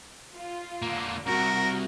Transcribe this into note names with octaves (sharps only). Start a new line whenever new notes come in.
F4
D3 A#3
C2 F#2 F#4 A#4